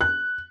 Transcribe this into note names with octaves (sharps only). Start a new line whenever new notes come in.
F#6